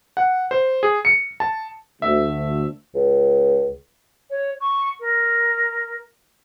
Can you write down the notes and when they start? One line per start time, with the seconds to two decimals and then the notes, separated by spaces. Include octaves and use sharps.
0.17 F#5
0.51 C5
0.83 G#4
1.05 C#7
1.40 A5
2.02 D2 A3 E5
2.95 C#2
4.30 C#5
4.60 C#6
5.00 A#4